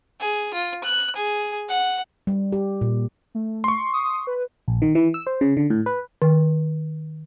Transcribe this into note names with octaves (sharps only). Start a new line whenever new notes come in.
G#4
F4
F#6
G#4
F#5
G3
G4
A#2
A3
C6 C#6
D#6
B4
A#1
D#3
E3
E6
C5
C#3
D3
A2
B4
D#3